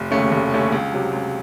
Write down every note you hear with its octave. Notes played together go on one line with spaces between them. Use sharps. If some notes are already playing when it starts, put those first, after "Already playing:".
Already playing: F1
D#2 C#3 A3 C#4
F1
D#2 C#3 A3 C#4
C#2
C3 F#3
C#2